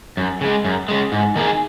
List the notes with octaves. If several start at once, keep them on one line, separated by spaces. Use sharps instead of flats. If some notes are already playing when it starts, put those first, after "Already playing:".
F#2
C#3 G#3
F#2
C#3 G#3
G#2
D#3 A#3 D#4 G#4